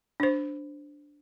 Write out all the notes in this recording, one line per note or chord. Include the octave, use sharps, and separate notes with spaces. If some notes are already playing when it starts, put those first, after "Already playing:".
D4 C5